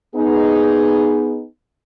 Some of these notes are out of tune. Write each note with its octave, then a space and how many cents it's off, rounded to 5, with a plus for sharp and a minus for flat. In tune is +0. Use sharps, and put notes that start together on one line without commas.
B3 +0 D#4 +0 G#4 +0